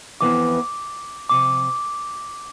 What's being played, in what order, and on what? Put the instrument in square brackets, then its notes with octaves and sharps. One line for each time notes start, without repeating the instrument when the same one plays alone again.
[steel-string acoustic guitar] F2 E3 B3 E4 [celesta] D6
[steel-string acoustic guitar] C3 F3 [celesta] D6